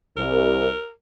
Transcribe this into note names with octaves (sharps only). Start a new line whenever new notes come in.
C2 A#4